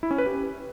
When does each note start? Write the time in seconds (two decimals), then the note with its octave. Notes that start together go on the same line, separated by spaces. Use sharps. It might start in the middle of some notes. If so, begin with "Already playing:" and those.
0.03 E4
0.11 C#4
0.18 B4
0.26 G4